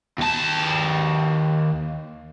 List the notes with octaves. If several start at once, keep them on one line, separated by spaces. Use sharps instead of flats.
D#2 A5